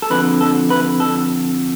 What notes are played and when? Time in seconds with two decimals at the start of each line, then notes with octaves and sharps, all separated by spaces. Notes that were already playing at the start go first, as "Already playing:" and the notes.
0.02 A4
0.10 F2 D3 B4
0.41 A4
0.70 B4
1.00 A4